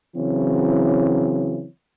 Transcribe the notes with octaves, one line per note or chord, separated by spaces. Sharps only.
C#3 E3 F#3 C4 E4 C#5